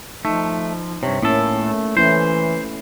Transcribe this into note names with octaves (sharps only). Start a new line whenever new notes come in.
F3 A3 D#4
G2 C3 C#5
A2 A#3 C#4 E4 A4
A3
E3 A3 C#4 E4 C5